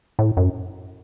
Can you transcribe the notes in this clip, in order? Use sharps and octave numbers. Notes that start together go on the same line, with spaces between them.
A2
F#2